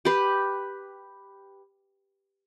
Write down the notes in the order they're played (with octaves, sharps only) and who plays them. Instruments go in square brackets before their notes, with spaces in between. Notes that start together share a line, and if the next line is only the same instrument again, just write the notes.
[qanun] G4 B4